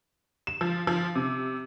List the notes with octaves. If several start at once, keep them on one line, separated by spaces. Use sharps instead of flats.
E7
F3
F3
C3